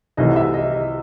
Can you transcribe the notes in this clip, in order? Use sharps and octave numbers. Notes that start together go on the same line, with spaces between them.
C2 C3 E3 A3 D#5
E5
D#5
D#5